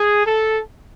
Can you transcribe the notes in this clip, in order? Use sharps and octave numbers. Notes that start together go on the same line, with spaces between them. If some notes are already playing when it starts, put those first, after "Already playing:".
Already playing: G#4
A4